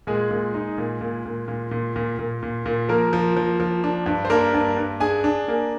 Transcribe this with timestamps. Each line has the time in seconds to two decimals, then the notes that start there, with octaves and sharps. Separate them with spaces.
0.07 A#2 G#3 G#4
0.31 A#2
0.54 D#4
0.78 A#2
1.01 A#2
1.25 A#2
1.48 A#2
1.71 A#2
1.96 A#2
2.19 A#2
2.43 A#2
2.66 A#2
2.89 F3 A#3 A#4
3.13 F3
3.37 F3
3.60 F3
3.84 D4
4.06 G2
4.25 C5
4.30 A#3 D4 A#4
4.54 G2
4.77 G2
5.00 D4 G#4 G#5
5.24 D4
5.48 A#3